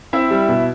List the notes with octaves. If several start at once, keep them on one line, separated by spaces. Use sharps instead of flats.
C4 E4 E5
G3
B2